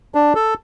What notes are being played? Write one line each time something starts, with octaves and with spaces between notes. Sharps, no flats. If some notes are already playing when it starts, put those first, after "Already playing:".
D4
A4